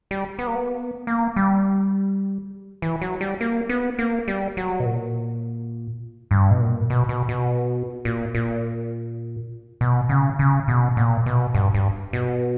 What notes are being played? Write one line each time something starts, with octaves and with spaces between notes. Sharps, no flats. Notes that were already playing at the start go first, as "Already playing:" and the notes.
G3
B3
A#3
B3
A#3
G3
E3
F#3
G3
A#3
B3
A#3
G3
F#3
B2
A#2
G2
B2
A#2
B2
B2
B2
A#2
A#2
B2
C#3
C#3
B2
A#2
B2
G2
G2
B2